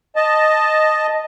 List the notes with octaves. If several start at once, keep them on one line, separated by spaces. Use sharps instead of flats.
D#5 A5